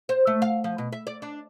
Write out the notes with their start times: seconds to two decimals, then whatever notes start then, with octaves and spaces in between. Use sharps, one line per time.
0.09 C5
0.27 A3
0.42 F5
0.64 F3
0.78 B2
0.92 E5
1.07 D5
1.22 D4